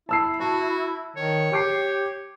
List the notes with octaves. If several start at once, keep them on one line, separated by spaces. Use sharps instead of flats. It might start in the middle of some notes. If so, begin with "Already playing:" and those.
E4 A5 E6 C7
F#4 A5
D#3 C#5
G4 G5 D6 C7